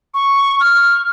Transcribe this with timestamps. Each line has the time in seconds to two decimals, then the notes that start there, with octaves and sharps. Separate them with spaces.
0.14 C#6
0.60 F6